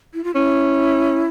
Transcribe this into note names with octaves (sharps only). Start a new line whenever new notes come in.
E4
F4
C#4 E4